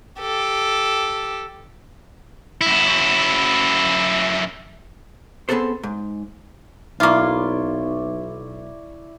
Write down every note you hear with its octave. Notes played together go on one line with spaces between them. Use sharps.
G4 A4
F#2 E4
B3 C4 G#4 A4 C5
G#2
B1 A#3 E4 F4 D5 C#6